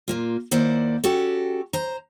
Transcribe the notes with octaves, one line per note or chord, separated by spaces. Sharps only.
A#2 A#3 F4
D#2 A#3 E4 C5 D5 F#5
C#4 F#4 G4 A4
C5 A#5